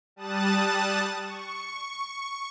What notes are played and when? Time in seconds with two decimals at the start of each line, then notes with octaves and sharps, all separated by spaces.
0.16 G3 A5 D#6 F#6 A6 E7
1.23 C#6